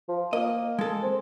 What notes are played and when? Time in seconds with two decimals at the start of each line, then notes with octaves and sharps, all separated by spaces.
0.08 F3
0.33 A#3 D#5
0.79 G#3 A4
1.03 C4